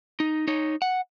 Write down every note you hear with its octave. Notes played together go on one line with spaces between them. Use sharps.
D#4
D#4 C#5
F#5